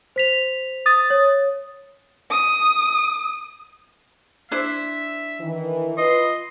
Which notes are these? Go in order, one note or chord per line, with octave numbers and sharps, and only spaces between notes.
C5 B6 F7
D#6 A6
C#5
D#6
D4 E4 C5 E5
D#3 E3
F4 B4 D#5 C6